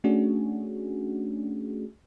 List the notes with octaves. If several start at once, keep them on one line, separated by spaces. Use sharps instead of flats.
A3 C#4 D4 F#4 G#4